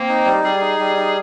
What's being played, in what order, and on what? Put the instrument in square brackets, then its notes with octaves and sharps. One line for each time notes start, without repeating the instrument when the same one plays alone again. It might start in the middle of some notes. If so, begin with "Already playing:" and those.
Already playing: [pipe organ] A#3 [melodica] C4
[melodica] D#4
G3
[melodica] G3 [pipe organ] G#4
[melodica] D#4
G3
D#4